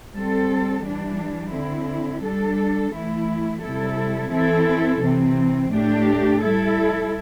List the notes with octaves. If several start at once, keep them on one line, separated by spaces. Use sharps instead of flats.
G3 C4 A4
E3 G3 D4
D3 C4 E4
G3 D4 A4
E3 A3 E4
C3 G3 E4 A4
E3 C4 E4 A4
C3 E3 C4
A2 A3 D4 G4
G3 E4 A4